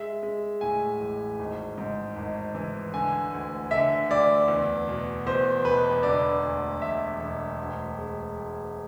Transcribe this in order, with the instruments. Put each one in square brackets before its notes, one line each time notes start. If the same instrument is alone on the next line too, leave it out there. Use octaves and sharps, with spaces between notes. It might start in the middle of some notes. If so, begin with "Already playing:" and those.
Already playing: [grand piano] G#3 E5
G#3
A2 G#5
A1
G#1
G#2
G#1
E3
D3 G#5
D2
D3 E5
D2 D5
E2
B2
E2 C5
E1 B4
D3 D5
D2
E1 E5
E1
D2
G#3
D2